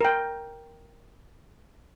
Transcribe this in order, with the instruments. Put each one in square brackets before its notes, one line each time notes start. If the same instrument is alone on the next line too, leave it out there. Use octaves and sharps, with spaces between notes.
[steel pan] A#4 G5